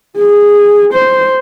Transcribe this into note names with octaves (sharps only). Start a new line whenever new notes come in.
G#4
C5